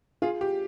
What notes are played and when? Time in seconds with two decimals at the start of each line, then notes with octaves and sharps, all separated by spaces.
0.22 F4 G#4
0.41 G4